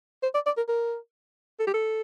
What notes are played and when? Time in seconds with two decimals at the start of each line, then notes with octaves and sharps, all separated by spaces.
0.23 C5
0.34 D5
0.46 D5
0.57 A#4
0.69 A#4
1.60 A4
1.67 G4
1.74 A4